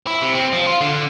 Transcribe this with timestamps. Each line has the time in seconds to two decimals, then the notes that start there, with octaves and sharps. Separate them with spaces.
0.07 E4
0.22 C3
0.35 C4
0.53 F3
0.67 F4
0.81 D3